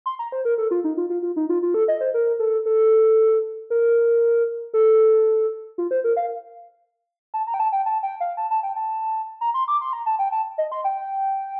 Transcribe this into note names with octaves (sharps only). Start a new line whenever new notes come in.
C6
A#5
C5
A#4
A4
F4
D#4
F4
F4
F4
D#4
F4
F4
A4
D#5
C5
A#4
A4
A4
A#4
A4
F4
C5
A#4
F5
A5
A#5
G5
A5
G5
A5
G5
F5
A5
A5
G5
A5
A#5
C6
D6
C6
A#5
A5
G5
A5
D#5
C6
G5